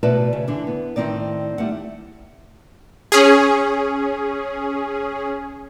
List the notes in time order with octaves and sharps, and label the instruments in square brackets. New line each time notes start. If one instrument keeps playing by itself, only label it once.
[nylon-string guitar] B2 A3 F#4 B4 D5 A5
C#3
D3 E3 D4
B3
A2 D#3 C4 D#4 D5
G3 A3 F#5
[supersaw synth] C#4 G#4